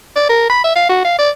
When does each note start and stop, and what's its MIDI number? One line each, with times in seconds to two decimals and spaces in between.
0.16 0.27 74
0.29 0.46 70
0.50 0.61 83
0.64 0.71 76
0.76 0.85 77
0.89 1.00 66
1.05 1.18 77
1.19 1.30 74